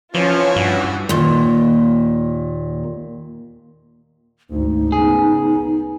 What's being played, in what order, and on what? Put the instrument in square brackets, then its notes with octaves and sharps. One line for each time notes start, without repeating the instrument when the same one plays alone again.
[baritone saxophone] E3 [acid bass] F3 [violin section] C#4 F4 C#5
[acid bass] G2 [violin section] F#4
[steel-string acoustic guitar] D#2 A#2
[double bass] G#1 D2 [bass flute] D#4
[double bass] C#3 B3 [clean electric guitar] G#4